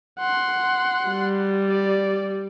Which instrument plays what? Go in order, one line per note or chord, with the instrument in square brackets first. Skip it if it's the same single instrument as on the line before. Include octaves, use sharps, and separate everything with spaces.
[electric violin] F#5 C6
[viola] G3
[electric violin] D5